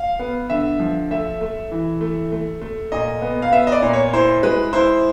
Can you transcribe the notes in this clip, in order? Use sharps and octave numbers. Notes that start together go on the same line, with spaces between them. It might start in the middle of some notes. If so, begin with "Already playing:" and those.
Already playing: F5
B3
D3 E5
F3
A3 E5
A3
E3
A3
A3
A3
A#2 D#5
B3
F5
B3 E5
D#5
D5
A#2
C#5
E4 C5
G#3 B4
E4 C5